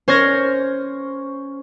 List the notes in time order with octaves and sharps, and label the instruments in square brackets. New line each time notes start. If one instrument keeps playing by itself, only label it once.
[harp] C#4 C5 C#5 F6 G#6 A#6